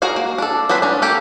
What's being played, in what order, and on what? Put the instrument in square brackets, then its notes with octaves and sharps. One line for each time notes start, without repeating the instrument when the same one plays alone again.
[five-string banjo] F#4 G#4 A#4 F5
A#3
D4 A4
F#3 B3 C4 B4
C#4 D4
A#3 G4 A4